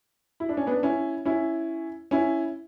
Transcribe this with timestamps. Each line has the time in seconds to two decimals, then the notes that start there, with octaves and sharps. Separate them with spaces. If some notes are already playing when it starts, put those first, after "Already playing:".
0.40 E4
0.49 D4
0.57 C#4
0.66 B3 D4
0.83 C#4 E4
1.25 C#4 E4
2.11 C#4 E4